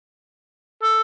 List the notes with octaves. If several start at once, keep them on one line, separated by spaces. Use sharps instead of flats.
A4